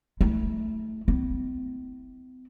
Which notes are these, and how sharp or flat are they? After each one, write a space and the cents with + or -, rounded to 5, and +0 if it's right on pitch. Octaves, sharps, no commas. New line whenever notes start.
A3 +0 E4 -30
C4 -45 E4 -30